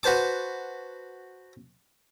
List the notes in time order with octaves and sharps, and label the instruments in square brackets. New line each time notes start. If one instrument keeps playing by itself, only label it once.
[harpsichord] F#4 B4 C5 A5 D6